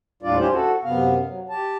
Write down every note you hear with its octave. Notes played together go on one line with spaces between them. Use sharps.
D#2 A2 G3 D4 F4 D5
C#4 D4 E4 G4 C5
F#4 A4
F#2 C3 B3 F5
F#3
G4 A5